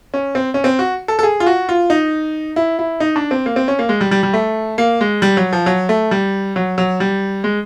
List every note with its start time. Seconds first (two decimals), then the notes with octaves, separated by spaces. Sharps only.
0.14 C#4
0.35 C4
0.54 C#4
0.64 C4
0.79 F#4
1.08 A4
1.19 A4
1.23 G#4
1.40 F4
1.46 F#4
1.69 F4
1.90 D#4
2.56 E4
2.79 E4
3.00 D#4
3.16 D4
3.31 C4
3.46 A#3
3.56 C4
3.68 C#4
3.79 A#3
3.89 G#3
4.01 G3
4.11 G3
4.23 G3
4.34 A3
4.78 A#3
5.01 G#3
5.22 G3
5.37 F#3
5.53 F3
5.66 F#3
5.89 A3
6.11 G3
6.56 F#3
6.78 F#3
7.00 G3
7.44 G#3